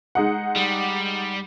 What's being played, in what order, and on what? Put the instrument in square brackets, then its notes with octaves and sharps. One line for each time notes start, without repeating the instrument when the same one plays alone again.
[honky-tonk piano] G#3 D#4 F#5
[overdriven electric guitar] G3